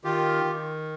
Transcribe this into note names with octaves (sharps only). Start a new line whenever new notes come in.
D#3 F4 G4
D#3